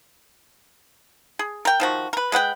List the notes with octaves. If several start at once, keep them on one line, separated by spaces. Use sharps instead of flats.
G#4
A#4 G5
D#3 F3 F#4
A#4 B4
G#3 B4 F#5 G5